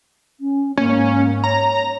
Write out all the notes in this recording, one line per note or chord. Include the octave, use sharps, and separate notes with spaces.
C#4
G#2 A#3 C#4
C#5 A#5